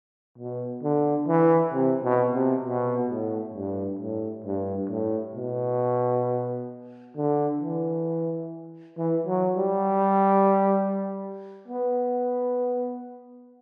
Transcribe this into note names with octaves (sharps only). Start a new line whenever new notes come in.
B2
D3
E3
C3
B2
C3
B2
A2
G2
A2
G2
A2
B2
D3
E3
E3
F#3
G3
B3